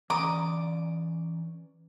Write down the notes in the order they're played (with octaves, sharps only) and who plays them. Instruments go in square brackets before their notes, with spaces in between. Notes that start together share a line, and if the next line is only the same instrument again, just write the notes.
[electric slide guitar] E3 C#4 D5 [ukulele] A#5 [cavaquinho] D6 D#6